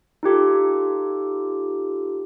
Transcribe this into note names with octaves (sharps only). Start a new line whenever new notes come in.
D#4 F4 G4 A4